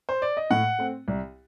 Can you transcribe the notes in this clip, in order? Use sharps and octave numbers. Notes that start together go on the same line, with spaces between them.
C5
D5
D#5
A2 F#5
A3 C4
C2